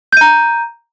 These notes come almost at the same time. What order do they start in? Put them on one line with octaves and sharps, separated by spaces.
G6 D#7 A#5